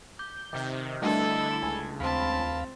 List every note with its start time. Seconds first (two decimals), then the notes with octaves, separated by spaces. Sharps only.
0.19 D6 G6
0.53 C3 D#3 D6
1.02 D3 G3 A3 D4 E4 A4 D#5
1.62 C#2 G#5
2.00 D#2 C4 F5 A5 B5